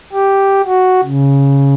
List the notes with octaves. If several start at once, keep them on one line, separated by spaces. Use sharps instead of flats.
G4
F#4
C#3